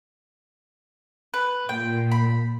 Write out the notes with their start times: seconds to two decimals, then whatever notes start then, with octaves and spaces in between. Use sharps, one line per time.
1.34 B4
1.69 A#2 G5
2.11 B5